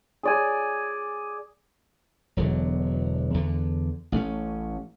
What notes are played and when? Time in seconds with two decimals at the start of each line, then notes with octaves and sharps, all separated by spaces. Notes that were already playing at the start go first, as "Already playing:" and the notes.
0.23 G#4 D5 G#5
2.37 E1 E2 D3 F#3
3.34 E2 D3
4.12 A1 A3 C#4